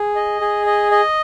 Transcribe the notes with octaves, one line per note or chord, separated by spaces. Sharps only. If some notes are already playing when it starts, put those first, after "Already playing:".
Already playing: G#4
D#5
G#4
D#5
D#5